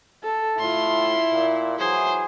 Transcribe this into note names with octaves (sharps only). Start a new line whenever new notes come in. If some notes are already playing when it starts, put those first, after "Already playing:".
A4
A2 E4 F4 C6
A#2
E3 F#3 G#4 C5